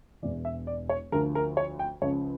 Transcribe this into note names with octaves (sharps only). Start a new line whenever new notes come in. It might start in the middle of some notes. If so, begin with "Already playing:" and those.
E1 E2 E3 D5
E5
D5
C#5
D2 D3 F3 A#4
A#4
C#5
G5
C#2 C#3 F3 C#5